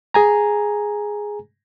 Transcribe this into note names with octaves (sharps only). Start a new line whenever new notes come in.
G#4 G#5 A#5